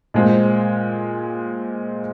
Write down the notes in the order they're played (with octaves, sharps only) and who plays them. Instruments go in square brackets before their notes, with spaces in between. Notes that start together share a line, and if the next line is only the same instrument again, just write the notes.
[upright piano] A#2 G#3 C4